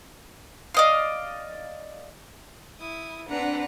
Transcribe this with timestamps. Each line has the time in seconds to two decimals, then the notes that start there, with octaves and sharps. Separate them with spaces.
0.74 D5 D#5 F5
2.80 E4 D#6
3.28 C4 D4 B4 F#5 A#5